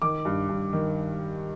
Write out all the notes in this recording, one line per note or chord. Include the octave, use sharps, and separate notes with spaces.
D#3 D6
G2
G2
D#3